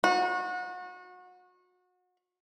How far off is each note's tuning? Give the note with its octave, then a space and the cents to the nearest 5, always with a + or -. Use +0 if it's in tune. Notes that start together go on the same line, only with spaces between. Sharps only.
F#4 -30